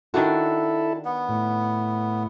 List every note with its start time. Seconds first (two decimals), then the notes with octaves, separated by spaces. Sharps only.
0.14 D#3 D4 E4 F#4 A4
1.05 B3
1.29 A2